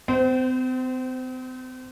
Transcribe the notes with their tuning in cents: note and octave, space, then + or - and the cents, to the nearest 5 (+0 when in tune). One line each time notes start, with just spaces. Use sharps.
C4 -40 C5 -15